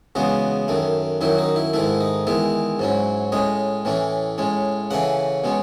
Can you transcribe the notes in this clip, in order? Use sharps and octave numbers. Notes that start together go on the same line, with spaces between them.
E2 C#3 G#3 B3 F#4
F#2 D#3 A3
F#2 D#3 F#3 E4
D#4
E4
G#2 D#3 A3 E4
D#4
E2 D#3 G#3 E4
G#2 F#3 C#4
A2 G#3 C#4 D#5
A2 E3 A3 C#4
A2 G#3 C#4
C#3 E3 A3 C#4 F#5
B2 G#3 C#4